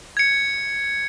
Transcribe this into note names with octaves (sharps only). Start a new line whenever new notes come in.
G#6 C#7